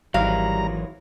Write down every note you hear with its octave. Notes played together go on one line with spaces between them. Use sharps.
G#1 E3 F#3 G3 F5 A#5